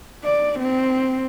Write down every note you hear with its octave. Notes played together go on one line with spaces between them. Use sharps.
D5
C4